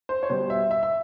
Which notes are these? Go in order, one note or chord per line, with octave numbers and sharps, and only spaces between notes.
C5
C#5
B2 G3 B3 C5
E5
E5
E5